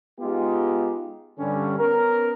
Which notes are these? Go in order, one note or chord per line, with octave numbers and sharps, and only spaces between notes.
G#3 B3 D#4 F4 G4
G2 D3 G3 C#4
B3 C#4 A#4